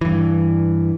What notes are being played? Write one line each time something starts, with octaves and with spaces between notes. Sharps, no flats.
G2 E3